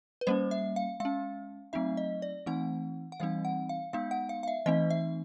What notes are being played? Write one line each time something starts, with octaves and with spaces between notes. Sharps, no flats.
B4
G3 A#3 C#4 C5
E5
F5
G#3 C#4 F5
F#3 A3 C4 D#4 E5
D#5
D5
E3 A3 C4 D#4 F#5
F#5
E3 G3 C4 D#4 F5
F#5
F5
G#3 B3 D#4 F5
F#5
F5
F5
E5
E3 A3 C4 D#4 D#5
E5